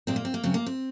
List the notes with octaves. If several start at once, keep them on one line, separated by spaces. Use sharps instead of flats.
A#2 G#3 C4
A#3
C4
A#3
F#2 C#3 F#3 C4
A#3
C4